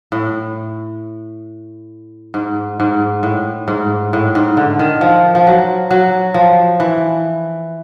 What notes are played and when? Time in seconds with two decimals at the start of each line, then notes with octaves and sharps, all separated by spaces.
0.12 A2
2.34 G#2
2.80 G#2
3.23 A2
3.68 G#2
4.13 A2
4.35 G#2
4.57 D3
4.79 D#3
5.01 F3
5.35 F3
5.47 F#3
5.91 F#3
6.34 F3
6.80 E3